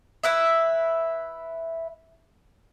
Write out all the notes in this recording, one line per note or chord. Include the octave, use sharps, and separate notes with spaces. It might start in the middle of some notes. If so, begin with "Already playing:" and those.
E4 B4 E5